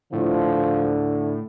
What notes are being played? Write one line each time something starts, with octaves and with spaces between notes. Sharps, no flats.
A2 D3 F3